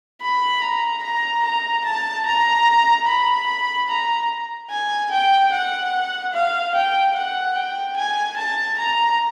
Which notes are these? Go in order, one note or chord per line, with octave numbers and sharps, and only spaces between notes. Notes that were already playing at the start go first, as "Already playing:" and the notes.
B5
A#5
A#5
A#5
A5
A#5
B5
A#5
G#5
G5
F#5
F5
G5
F#5
G5
G#5
A5
A#5